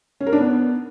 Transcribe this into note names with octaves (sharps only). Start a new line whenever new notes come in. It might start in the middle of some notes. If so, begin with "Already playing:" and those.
C#4
A#4
D4
B3